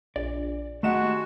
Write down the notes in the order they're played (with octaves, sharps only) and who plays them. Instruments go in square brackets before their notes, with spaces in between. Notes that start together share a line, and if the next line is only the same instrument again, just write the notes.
[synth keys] A#1 [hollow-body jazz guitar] D5
[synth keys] D#3 G4 E7 [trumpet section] G#3 F#4 [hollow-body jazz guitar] A3 D#5 F#5